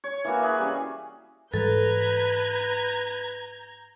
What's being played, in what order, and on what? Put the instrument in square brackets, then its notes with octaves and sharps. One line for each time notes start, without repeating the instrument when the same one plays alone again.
[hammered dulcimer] C#5
E3 A#3 F#4
G#4 B4
G3 C#4
[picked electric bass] G#2 E3 G3 [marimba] A4 [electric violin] B4 [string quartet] A#5 G6 G#6